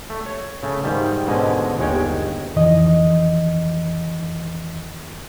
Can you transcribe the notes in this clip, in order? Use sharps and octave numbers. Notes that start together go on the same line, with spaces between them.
A3
C#5
C#3 A3
G#2 D#3 G3
G#2 B2 D3 C#4 D#5
G1 D#2 G#3 C#5 G5
F2 D#3 E3 D#5